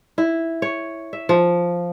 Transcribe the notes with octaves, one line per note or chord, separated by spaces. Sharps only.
E4
C#5
E5
F3